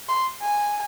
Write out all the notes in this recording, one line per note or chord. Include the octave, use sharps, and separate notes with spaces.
C6
G#5